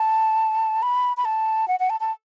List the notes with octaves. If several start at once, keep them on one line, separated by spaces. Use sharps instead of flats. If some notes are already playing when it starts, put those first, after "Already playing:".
Already playing: A5
B5
B5
A5
F#5
F#5
A5
A5